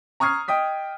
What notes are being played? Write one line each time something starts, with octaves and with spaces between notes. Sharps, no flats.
A#5 C#6 D#6 F6 G#6 C7
D#5 G5 D#6 B6